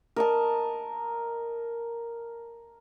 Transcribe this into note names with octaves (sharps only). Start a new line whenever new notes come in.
A#4 D#5 A5